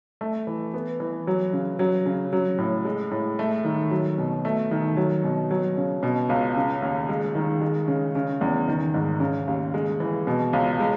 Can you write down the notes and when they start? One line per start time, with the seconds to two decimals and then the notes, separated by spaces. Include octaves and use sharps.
0.21 A3
0.47 E3
0.74 B3
1.00 E3
1.27 F#3
1.53 C#3
1.79 F#3
2.06 C#3
2.33 F#3
2.58 A2
2.85 G#3
3.11 A2
3.39 A3
3.65 D#3
3.91 F#3
4.18 B2
4.45 A3
4.71 D#3
4.97 F#3
5.24 B2
5.51 F#3
5.77 C#3
6.03 B2
6.29 C#2
6.56 C#3
6.82 D#2
7.09 G#3
7.35 D#3
7.61 G#3
7.88 C#3
8.15 C#3
8.41 E2
8.68 D#3
8.94 G#2
9.20 C#3
9.48 D#2
9.74 G#3
10.00 E3
10.27 B2
10.53 C#2
10.80 G#3